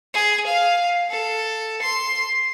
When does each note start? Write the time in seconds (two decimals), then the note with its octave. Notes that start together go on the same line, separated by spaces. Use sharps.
0.14 G#4
0.47 F5
1.10 A4
1.82 C6